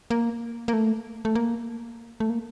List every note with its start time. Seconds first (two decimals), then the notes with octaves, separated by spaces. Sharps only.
0.10 A#3
0.68 A#3
0.73 A3
1.25 A3
1.35 A#3
2.20 A3
2.30 A#3